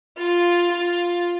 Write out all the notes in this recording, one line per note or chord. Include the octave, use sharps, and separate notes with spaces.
F4
F4